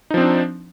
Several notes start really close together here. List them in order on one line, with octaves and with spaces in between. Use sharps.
D#4 F3 C4 D4